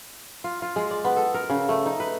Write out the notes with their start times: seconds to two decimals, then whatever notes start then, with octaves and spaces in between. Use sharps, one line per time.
0.44 F4
0.62 F4
0.76 G#3
0.91 D5
1.05 B3
1.17 A4
1.34 A#4
1.50 C#3
1.69 A3
1.86 D#4
2.00 B4